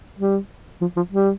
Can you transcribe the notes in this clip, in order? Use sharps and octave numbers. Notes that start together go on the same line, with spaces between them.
G3
F3
F3
G3